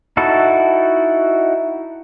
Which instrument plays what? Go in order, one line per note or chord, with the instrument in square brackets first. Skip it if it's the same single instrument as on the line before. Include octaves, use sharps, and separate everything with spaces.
[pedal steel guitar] D#4 E4 F#4 A4